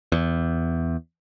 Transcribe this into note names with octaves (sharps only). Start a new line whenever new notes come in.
E2